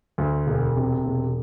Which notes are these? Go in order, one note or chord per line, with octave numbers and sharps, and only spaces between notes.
D2
E1
C3
E1